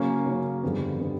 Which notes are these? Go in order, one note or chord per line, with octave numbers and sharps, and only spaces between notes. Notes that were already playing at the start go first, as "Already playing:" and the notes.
Already playing: C#3 F#3 A#3 C#4
C#3 F#3 A#3 C#4
G1 F2 D3 G3 B3
D3 G3 B3